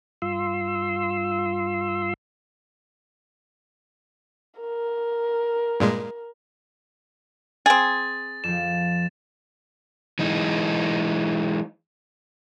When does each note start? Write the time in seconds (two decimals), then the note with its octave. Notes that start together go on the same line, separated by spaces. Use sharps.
0.22 G2 F4 C6 E6
4.60 A#4
5.80 G2 A#2 G#3
7.66 C4 G#4 A6
8.44 F2 F3 E7
10.19 E3 G#3 D#4